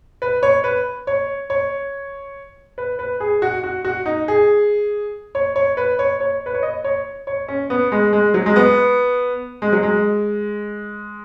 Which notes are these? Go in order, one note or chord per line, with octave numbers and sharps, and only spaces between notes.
B4
C#5
B4
C#5
C#5
B4
B4
G#4
F#4
F#4
F#4
D#4
G#4
C#5
C#5
B4
C#5
C#5
B4
C#5
D#5
C#5
C#5
C#4
B3
G#3
G#3
F#3
G#3
B3
G#3
F#3
G#3